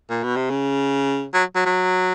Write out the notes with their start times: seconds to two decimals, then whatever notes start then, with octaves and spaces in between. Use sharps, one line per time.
0.10 A#2
0.24 B2
0.36 C3
0.50 C#3
1.34 F#3
1.55 F#3
1.66 F#3